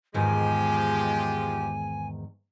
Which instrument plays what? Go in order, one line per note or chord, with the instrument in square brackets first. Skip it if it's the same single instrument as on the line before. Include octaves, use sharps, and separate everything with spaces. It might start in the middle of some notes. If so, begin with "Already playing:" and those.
[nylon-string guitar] E2 G#2 D#3 [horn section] F3 G#3 G4 [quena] G#5